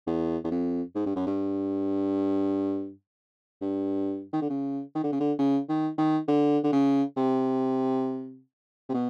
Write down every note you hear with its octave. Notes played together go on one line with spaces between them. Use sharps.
E2
E2
F2
G#2
G2
F#2
G2
G2
D#3
D3
C#3
D#3
D3
C#3
D3
C#3
D#3
D#3
D3
D3
C#3
C3
C3
B2